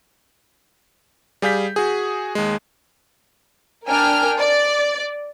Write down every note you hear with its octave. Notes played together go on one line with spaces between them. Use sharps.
G3 G#4 F5 G6 B6
F#4 G#4
D#2 G#3
D4 A#4 G5 G#5 F6
D5